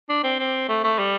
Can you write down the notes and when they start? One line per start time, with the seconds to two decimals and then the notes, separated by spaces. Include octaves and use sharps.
0.09 D4
0.24 C4
0.39 C4
0.69 A3
0.84 A3
0.99 G3